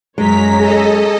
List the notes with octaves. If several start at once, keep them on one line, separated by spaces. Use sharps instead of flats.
F#2 G#3 C#5 A#5 B6
G#4 A4 D#5